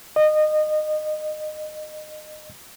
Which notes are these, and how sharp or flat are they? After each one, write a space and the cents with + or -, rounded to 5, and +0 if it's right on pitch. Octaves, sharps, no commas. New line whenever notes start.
D#5 -25